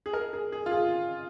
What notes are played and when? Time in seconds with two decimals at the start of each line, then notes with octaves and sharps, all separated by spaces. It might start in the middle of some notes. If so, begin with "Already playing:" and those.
0.06 G#4
0.13 A#4
0.33 G#4
0.52 G#4
0.66 F4
0.71 G#4